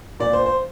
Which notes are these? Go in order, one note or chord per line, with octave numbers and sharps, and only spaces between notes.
A#2 D5
C5
C5